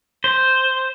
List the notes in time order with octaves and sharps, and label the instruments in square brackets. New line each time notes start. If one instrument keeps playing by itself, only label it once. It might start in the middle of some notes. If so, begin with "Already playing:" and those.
[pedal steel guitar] C5